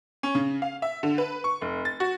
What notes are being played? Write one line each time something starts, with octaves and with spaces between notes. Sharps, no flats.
C#4
C#3
F5
E5
D3
B4
C#6
F1
A6
F#4